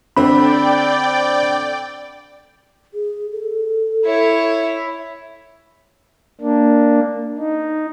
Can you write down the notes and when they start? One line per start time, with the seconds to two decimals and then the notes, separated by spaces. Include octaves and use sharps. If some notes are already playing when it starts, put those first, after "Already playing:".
0.17 D3 C4 D5 G5 B5
2.94 G#4
3.32 A4
4.05 E4 C#5
6.41 A#3 D4
7.38 D#4